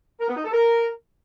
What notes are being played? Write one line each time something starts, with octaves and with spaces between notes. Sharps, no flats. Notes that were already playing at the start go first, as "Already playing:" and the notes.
A#4
B3
D#4
A4
A#4